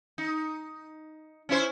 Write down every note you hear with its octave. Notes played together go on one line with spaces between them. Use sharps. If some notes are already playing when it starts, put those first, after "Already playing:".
D#4
C#4 E4 C5